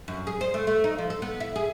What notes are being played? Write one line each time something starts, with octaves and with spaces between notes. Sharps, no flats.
F#2
G#4
C5
A3
A3
D#4
F3
A4
B3
E4
G#4